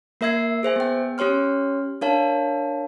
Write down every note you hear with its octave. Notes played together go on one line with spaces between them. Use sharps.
A#3 A#4 E5 E6 G#6 C7
G#4 C5 E5 G#5
B3 G5
C#4 G4 C#5 C6 F6
D4 A#4 C#5 F5 A5